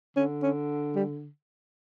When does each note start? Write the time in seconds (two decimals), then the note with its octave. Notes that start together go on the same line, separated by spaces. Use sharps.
0.16 D3 C#4
0.43 C#4
0.95 G3